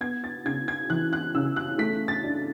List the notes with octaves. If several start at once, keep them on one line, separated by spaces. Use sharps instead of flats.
B3 G#6
A6
C#3 G#6
G#6
E3 F#6
F#6
C#3 E6
F#6
A3 B6
A6
D4